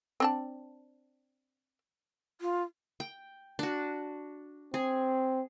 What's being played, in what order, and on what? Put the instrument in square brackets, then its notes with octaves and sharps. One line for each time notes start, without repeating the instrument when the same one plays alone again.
[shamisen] C4 D4 A5
[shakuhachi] F4
[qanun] G5
D4 F#4
[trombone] C4 [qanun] G#4